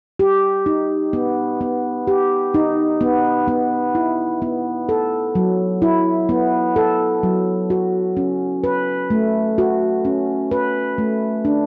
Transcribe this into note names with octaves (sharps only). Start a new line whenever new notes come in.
G4
D#4
B3
B3
G4
D#4
B3
B3
E4
B3
A4
F#3
E4
B3
A4
F#3
F#4
C#4
B4
A3
F#4
C#4
B4
A3
D4